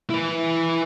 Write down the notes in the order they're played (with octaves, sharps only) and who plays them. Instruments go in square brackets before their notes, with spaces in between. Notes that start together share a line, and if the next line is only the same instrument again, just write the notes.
[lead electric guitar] E4 B4